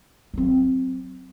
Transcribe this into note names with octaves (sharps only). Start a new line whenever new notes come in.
F#3 C4